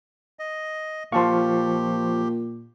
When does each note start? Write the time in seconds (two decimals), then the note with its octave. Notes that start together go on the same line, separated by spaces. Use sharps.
0.39 D#5
1.12 A#2 F3 G4 F5 A5 C6 C#6